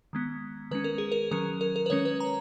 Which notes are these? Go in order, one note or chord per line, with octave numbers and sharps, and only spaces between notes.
D#3 G#3 B3
D#3 G#3 C#4 B4
A#4
G#4
A#4
D#3 F#3 C#4 A#4
A#4
A#4
B4
D#3 G#3 C#4 C#5
B4
A#5